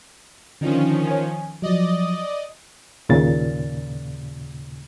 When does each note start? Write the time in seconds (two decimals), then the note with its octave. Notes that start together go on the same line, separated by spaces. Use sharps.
0.61 D3 D#3 F3 C#4 D4
1.07 C#5 G#5
1.62 F3 F#3 D5 D#5
3.09 D#2 A#2 C#3 A6